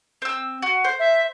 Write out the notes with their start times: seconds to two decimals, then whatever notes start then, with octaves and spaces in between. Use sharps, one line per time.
0.22 C4 E6
0.62 F#4
0.84 C5
1.00 E5